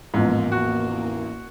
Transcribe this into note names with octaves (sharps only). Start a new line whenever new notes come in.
A1 E2 G#2 F3 A#3
F#4